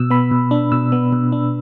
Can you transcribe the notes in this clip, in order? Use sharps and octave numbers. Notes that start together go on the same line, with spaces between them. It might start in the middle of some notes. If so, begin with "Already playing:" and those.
Already playing: B2 E6
B3 B5
B2
D4
B2 E6
B3
B2
D4